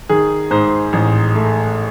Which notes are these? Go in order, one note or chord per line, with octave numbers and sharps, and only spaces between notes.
D#3 G#4
G#2 C5
A1
A3